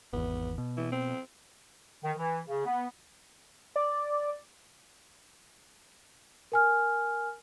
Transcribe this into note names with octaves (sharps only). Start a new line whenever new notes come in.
G#1 E2 B3
B2
E3
C4
D#3
E3
C#3
B3
D5
A#4 G#5 F6